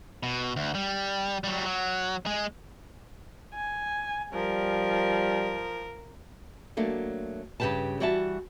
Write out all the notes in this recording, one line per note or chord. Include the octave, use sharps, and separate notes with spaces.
B2
D2
G3
F#3 G3
F#3
G#3 G#4
G#5
F3 G3 A#4
F#3 A3 A#3 D4
G2 C#3 E3 G4 B4 A5
E3 G3 F#4 E5 A5